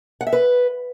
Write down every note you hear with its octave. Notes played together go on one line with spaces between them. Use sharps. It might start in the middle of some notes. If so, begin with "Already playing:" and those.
F#5
E5
B4